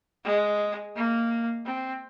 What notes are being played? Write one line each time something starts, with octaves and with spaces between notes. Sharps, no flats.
G#3
A#3
C4